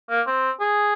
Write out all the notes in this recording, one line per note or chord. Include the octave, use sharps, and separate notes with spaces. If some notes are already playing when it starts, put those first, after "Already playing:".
A#3
C4
G#4